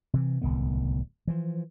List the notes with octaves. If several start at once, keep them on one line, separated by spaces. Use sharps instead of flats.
C3 E3
D1 C2 D#3 B3
E3 F3